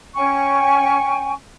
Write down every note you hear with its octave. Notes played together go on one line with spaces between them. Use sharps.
C#4 G5 G#5 C#6